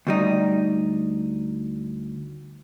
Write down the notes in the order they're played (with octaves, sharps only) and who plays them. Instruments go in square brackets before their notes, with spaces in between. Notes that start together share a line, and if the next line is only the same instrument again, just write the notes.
[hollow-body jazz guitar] D2 G3 D#4